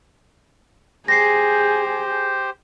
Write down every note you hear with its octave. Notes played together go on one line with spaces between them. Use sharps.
G4 G#4 C5 A#6 C7